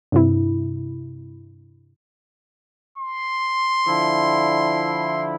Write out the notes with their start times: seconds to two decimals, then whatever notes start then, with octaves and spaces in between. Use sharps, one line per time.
0.12 G2 C3 E4
2.98 C6
3.87 D3 F3 E4